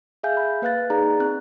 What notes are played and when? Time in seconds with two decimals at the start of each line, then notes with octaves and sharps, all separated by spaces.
0.23 G#4 E5 F5 G#5 G6
0.37 B5
0.62 A#3 B4 F5 F#6 A6
0.90 D#4 G#4 D5 A#5
1.20 C4 F#6